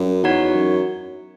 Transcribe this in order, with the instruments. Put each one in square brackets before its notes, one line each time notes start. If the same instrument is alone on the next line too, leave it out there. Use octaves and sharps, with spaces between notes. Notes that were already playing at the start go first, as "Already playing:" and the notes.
Already playing: [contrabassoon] F#2
[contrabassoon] E2 [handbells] D#4 F#4 C#5 F#5
[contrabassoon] F#2